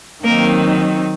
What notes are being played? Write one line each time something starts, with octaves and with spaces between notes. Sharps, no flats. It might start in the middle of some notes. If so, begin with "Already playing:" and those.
D#3 F#3 A#3 C4 D#4 A#4